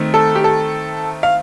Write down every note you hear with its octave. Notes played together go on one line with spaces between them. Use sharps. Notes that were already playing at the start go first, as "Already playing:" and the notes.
Already playing: D#3 A3 C4
A4
G4
A4
F5